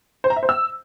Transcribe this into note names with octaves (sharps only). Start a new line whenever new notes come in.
C5
A#5
E5
C5
E6